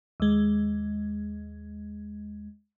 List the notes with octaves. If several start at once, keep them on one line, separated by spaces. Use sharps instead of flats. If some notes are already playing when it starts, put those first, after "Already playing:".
D#2 G#3